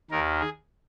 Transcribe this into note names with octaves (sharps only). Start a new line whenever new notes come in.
D#2 D#3 A#4
G#4